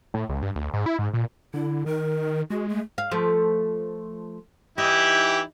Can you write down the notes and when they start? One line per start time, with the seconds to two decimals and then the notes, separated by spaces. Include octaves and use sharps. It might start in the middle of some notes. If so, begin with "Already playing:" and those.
0.14 A2
0.29 C#2
0.43 G2
0.56 D2
0.74 G#2
0.86 E4
0.99 G#2
1.13 A#2
1.54 D3 E4
1.86 D#3 A#4
2.50 G#3 F#4
2.69 A3
2.98 F5
3.11 F3 A3
4.78 E3 D#4 E4 G4